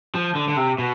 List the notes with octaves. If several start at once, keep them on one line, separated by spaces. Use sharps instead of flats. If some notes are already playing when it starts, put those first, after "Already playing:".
F3
D3
D3
C3
B2